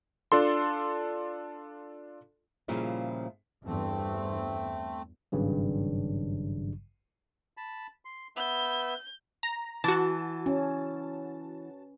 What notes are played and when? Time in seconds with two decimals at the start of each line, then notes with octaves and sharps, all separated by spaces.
0.32 D4 F4 A4 C6
2.68 A#2 C#3 F3 G3 E4
3.65 E2 G2 A3 C4
5.32 G#1 G2 C#3 F#3
7.57 A5 B5
8.05 C6
8.36 B3 B4 E5 G6
9.43 A#5
9.84 E3 F#4 A5
10.46 C#4